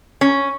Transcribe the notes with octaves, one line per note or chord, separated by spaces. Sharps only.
C#4